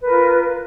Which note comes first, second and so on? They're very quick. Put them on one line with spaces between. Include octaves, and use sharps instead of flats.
B4 A#4 F4